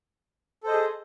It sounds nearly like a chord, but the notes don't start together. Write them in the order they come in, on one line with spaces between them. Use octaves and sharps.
A4 C5 D#5 G#4